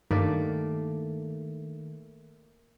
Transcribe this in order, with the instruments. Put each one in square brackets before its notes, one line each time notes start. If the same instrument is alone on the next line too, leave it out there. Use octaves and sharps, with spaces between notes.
[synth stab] G2 [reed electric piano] D#3 [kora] A3 A#3 D5